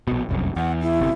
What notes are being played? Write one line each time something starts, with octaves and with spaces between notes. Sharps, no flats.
A#1 B2
F1 C2 F#2
E2 F#5
E4
G1 C3